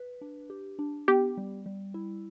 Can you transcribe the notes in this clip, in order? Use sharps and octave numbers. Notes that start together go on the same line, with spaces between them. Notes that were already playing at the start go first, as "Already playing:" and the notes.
Already playing: B4
D4
G4
D4
B3 G4
G3
G3
E4